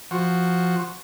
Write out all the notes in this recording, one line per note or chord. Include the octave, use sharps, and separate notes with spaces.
F3 F#4